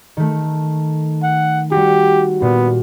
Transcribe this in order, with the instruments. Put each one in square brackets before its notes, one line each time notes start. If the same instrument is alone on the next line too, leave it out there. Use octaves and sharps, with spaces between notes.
[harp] D#3 A3
[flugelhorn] F#5
[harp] G3 F#4 [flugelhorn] G4
[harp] A#2 [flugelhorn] B3